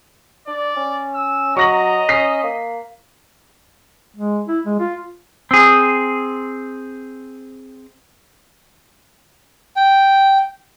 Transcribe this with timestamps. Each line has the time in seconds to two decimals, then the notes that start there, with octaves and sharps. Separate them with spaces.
0.47 D4 D5
0.76 C#4
1.15 E6
1.57 F#3 D#5 A#5 C#6 A#6 F#7
2.09 C#4 B6 C7
2.43 A#3
4.16 G#3
4.47 E4
4.65 G#3
4.80 F4
5.51 C4 G#4
9.76 G5